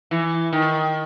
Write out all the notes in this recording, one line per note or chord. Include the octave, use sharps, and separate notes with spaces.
E3
D#3